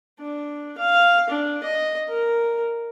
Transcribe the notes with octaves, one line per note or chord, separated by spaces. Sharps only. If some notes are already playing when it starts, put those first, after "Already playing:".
D4
F5
D4
D#5
A#4